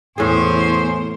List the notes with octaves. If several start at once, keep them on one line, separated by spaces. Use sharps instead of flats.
E2 A2 G#4 C5 G#5 C#6